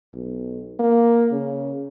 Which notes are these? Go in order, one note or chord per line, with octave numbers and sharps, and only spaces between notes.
B1
A#3
C#3